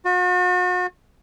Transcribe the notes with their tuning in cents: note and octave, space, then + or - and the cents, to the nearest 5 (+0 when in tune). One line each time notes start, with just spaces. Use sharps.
F#4 -40